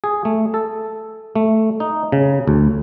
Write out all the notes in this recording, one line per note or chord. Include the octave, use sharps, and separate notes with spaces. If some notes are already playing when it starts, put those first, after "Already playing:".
G#4
A3
A4
A3
D#4
C#3
D2